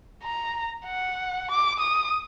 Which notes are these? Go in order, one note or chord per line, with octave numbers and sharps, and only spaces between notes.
A#5
F#5
D6
D#6